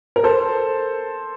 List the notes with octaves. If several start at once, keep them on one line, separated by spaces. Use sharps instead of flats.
A#4
A4 C5